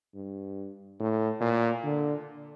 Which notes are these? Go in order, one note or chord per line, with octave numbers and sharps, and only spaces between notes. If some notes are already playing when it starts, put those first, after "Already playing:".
G2
A2
A#2
D3